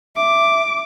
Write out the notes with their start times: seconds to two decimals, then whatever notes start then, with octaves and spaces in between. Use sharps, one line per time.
0.16 E5 D6